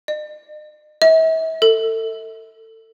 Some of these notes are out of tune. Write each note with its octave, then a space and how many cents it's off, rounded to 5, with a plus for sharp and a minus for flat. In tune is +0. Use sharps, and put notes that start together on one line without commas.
D#5 -45
E5 -40
A4 +25